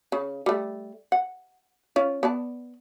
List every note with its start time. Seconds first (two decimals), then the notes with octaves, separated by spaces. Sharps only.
0.12 C#3
0.46 G3 A3
1.12 F#5
1.96 C#4 F4
2.23 B3 D5 A5